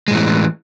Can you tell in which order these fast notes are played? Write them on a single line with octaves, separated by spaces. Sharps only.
G#3 A2 E3